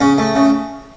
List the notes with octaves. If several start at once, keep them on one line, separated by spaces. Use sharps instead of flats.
C#3 C#4
A3
C#3